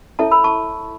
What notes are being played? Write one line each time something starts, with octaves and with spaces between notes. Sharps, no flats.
E4 A4 C#5 E5 A5
B5 E6
A5 C#6